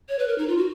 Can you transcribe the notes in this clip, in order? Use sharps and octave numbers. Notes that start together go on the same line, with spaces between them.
C#5
B4
A#4
D#4
F4
F#4